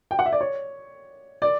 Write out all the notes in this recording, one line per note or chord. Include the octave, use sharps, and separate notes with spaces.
G5
F#5
E5
D5
C#5
D5